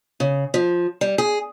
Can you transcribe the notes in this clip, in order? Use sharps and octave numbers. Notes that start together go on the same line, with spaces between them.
C#3
F3
G3
G#4